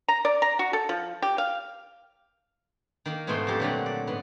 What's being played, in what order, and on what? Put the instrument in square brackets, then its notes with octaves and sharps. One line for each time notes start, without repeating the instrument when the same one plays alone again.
[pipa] A#5
D5
A#5
F#4
A4
F3
G4
F5
[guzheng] D#3 A#3
G#2 B2 G#3 A3 C5 C6
F2 F3 G4 A4
A#2 D3 F#3 A3 C4 F#5
D5
G#2 B3